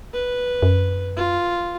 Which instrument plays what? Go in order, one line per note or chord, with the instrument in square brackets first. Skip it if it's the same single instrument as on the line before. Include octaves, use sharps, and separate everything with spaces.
[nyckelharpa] B4
[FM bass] F#2
[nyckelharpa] F4